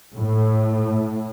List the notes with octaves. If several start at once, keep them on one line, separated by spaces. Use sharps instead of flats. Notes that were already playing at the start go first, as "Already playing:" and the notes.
A2